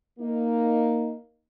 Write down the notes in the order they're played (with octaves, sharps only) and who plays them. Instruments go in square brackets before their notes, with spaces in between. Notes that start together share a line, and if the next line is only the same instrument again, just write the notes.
[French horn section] A#3 D#4